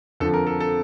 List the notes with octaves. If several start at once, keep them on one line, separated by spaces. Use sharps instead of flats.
F2 D3 F3 A4
A#4
A4
A4